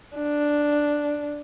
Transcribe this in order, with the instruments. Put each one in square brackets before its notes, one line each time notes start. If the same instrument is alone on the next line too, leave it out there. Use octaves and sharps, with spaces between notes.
[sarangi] D4